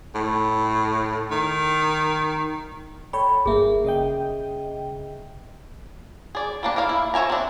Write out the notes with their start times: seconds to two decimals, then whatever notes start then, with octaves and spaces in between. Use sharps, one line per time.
0.15 A2
1.31 D#3
3.13 A4 C#5 G5 B5
3.46 G1 A#3 G#4 E5
3.84 C#3 D#5 G5
6.35 G#4 D5
6.63 G3 A#3 D4
6.76 A#3 E4 A#4 F5
6.89 E4
7.14 F3 C#5 E5 G#5 A#5
7.30 C4 D4